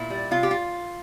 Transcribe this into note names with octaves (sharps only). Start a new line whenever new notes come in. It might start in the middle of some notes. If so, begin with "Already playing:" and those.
Already playing: A#2 E4
G3
C3 F4
G4
F4